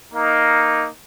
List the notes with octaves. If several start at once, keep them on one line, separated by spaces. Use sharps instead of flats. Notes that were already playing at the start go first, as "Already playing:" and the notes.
A#3 D#4